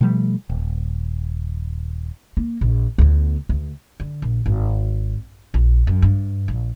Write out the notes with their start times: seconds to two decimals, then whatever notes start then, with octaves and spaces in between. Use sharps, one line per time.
0.01 B2 F3 G3 A3
0.49 D#1
2.37 A#3
2.61 A#1
2.98 D2 B3
3.49 D2
4.00 D3
4.22 A#1
4.46 G#1
5.54 A#1
5.87 F#2
6.02 G2
6.48 A#1